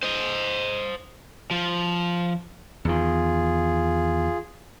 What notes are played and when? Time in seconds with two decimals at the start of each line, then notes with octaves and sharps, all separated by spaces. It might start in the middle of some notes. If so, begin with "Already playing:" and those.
0.03 C5 D#5
1.51 F3
2.85 E2 D#3 F4 G#4